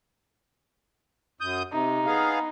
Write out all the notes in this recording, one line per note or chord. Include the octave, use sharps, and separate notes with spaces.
F#2 D#6 G6
C3 D#4
B3 G#4 F5